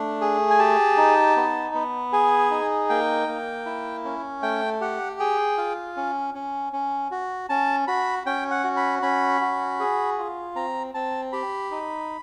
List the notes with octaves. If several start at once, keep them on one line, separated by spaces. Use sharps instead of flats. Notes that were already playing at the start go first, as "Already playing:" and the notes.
Already playing: A3 D4
G#4
G#5
G4 A5
D#4
B3
B3
G#4 G#5
D#4
A#3 G5
A#3
E4
C#4
A3 G5
G4 F#5
G#4 G5
F4
C#4
C#4
C#4
F#4
C#4 A5
F#4 B5
C#4 G5
F#5
F#4
B5
C#4 B5
F#4
G#4
F4
C4 A#5
C4 A5
G4 B5
D#4